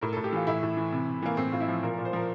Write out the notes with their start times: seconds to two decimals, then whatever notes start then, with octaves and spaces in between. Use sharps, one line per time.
0.01 A2 A#4
0.13 A2 A4
0.24 G4
0.32 E3 F4
0.47 A2 E4
0.63 A2
0.77 E3
0.92 C3
1.07 C3
1.22 E3 A#3
1.37 A2 C4
1.52 A2 F4
1.60 E4
1.68 F3
1.83 A#2 A#4
1.93 A#2 A#4
2.05 C5
2.13 F3 A#4